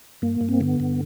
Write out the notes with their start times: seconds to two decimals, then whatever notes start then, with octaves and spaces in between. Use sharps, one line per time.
0.22 G2 A#3
0.41 G2
0.49 C4
0.61 D3 B3
0.80 G2